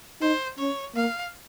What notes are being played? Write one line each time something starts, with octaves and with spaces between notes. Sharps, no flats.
D#4 C5
C#4 C#5
A#3 F5